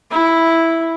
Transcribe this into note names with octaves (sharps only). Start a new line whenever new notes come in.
E4